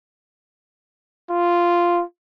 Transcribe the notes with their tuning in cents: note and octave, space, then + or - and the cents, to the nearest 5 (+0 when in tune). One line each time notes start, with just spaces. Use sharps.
F4 -5